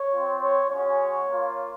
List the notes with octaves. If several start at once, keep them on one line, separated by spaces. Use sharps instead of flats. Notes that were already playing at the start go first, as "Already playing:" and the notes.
Already playing: C#5
C4 F4
C#5
G#3 C#4 F#4 C#5
A#3 F4